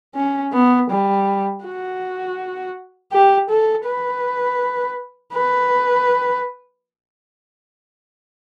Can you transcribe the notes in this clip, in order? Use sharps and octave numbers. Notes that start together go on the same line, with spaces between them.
C#4
B3
G3
F#4
G4
A4
B4
B4